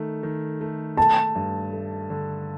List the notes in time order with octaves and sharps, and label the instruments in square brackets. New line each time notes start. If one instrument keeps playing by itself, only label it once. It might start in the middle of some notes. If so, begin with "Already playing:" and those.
Already playing: [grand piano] D#3 A3
D#3
A3
[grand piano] A3 [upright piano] A5
[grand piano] G2
A3
D3